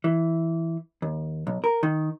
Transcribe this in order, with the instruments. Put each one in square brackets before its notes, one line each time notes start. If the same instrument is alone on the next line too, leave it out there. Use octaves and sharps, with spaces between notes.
[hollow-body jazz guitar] E3
D#2
B1
A#4
D#3